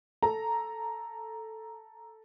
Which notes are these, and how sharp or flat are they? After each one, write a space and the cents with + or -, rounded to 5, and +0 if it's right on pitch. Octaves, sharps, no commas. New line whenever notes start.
A4 +0 A#5 +0